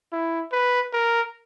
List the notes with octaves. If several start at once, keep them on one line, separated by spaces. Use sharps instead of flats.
E4
B4
A#4